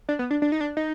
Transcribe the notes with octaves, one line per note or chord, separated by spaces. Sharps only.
D4
B3
D4
D4
D#4
D4
D#4